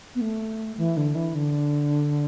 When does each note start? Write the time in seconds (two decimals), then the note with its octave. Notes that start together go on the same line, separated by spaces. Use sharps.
0.15 B3
0.21 A3
0.78 E3
0.97 D3
1.15 E3
1.34 D3